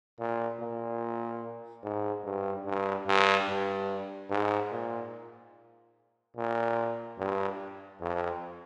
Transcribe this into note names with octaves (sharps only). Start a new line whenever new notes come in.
A#2
A#2
G#2
G2
G2
G2
G2
G#2
A#2
A#2
G2
F2